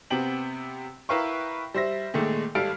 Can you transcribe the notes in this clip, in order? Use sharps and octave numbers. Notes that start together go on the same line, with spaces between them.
C3 B3 C4 G5 F#7
E4 A#4 B4 F5 G5 C#6
G3 C5 E5 A#6
A#2 D#3 G#3 A3
G#1 G3 A4 F5 F6 D7